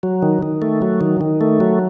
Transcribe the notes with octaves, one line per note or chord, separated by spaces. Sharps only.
F#3
D#3
D#3
A3
F#3
D#3
D#3
A3
F#3